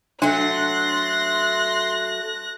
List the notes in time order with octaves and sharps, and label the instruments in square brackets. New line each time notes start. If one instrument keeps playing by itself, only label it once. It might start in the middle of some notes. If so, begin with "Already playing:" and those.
[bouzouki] F#3 A3 [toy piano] D4 [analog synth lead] C6 [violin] F#6 A#6